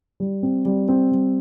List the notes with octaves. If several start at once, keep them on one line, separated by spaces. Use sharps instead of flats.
G3
C4
G3
C4
G3